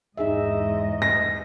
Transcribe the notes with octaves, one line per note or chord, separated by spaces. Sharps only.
E2 G#2 D#4 G#4 D#5 E5
A#6